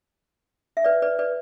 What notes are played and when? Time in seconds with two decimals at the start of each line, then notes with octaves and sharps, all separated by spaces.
0.77 E5
0.84 B4 D5
1.02 B4 D5
1.19 B4 D5